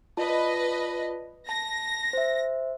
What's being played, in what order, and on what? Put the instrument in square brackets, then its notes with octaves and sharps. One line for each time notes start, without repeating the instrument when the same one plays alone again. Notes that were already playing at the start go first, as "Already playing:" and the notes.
[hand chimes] F4 D5 A5 [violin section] B4 D#5
[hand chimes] A5 [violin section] A#6
[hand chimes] C5 E5